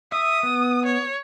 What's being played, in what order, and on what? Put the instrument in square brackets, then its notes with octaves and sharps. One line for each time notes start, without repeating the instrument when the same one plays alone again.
[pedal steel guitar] E5 [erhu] D#6
[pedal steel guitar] B3
[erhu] C#5